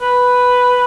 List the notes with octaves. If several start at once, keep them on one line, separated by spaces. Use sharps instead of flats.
B4